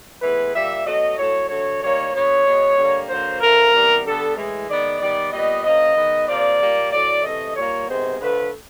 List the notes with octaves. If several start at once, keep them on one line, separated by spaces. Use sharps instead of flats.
A2 E3 G#3 B3 B4
A#2 G3 A#3 E5
B2 F#3 A3 D#5
A2 F#3 A3 C#5
D3 F#3 A3 C#5
D#3 G3 A#3 C#5
D3 F#3 B3 C#5
B2 G#3 B3
D3 G3 A#3
D3 F#3 A#3 C5
D3 F3 A3 A#4
C3 E3 G3 B3
D3 G3 B3 A4
A2 E3 G#3
D#3 G#3 B3 D5
D#3 G3 B3 D5
A#2 G3 B3 D#5
C#3 F3 A#3 D#5
D#3 G#3 B3
C3 F3 A#3 D5
A#2 G3 A#3
A2 F#3 A3 D5
C3 E3 A3 D#5
A#2 G3 A#3 C#5
C3 D#3 G#3 B3 C5
D3 F3 A3 B4